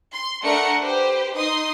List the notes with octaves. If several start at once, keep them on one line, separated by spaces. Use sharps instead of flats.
C6
A3 D4 A#4 F#5 C#7
G4 B4 C5
D#4 C6 D#6